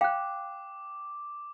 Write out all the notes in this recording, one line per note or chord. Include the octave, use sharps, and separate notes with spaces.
F5 G5 D6 F#6